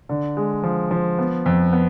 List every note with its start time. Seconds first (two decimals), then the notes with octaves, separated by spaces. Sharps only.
0.09 D3
0.37 G#3
0.63 F3
0.91 F3
1.19 B3
1.46 F2
1.73 B3